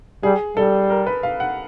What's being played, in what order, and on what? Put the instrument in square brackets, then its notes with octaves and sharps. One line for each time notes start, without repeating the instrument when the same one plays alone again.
[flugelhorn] G3 [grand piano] G#4
[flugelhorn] G3 [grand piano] A4
[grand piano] A#4
B4
F5
F#5